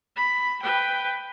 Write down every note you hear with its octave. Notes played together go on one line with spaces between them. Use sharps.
B5
B4 G5